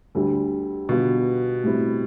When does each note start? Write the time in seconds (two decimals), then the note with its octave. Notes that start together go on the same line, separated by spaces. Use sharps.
0.15 D2 D3 G3
0.89 B2 D3 G3 B3 F4
1.64 A2 G3 C4 E4